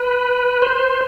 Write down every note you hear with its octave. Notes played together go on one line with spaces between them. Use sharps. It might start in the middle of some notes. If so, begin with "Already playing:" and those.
Already playing: B4
C5